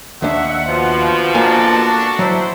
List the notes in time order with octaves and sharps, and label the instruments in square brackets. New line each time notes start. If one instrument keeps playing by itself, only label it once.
[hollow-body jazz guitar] D#2 D4 [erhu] E5 [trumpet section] F#5
[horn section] B2 F3 [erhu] C5
[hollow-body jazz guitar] A#3 G#5 [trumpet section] D4 F#4 [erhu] A4
[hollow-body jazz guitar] F#3 [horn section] E4 C5